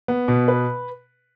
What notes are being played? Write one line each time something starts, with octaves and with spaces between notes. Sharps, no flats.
B3
B2
B4